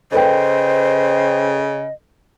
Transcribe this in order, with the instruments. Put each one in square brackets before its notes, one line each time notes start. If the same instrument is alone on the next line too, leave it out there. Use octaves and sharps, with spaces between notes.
[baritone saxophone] C#3 [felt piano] A4 B4 G5 [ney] C5 [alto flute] D#5